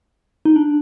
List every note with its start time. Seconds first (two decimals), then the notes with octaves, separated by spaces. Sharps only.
0.45 D#4
0.56 D4